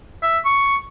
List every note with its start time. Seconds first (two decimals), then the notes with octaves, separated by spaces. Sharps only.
0.22 E5
0.45 C#6